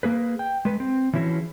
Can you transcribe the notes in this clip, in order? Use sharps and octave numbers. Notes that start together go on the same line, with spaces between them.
A#3 G#4 B4
G5
G#3 B4
C4
E3 F3 C#4 E4 F#4 G#4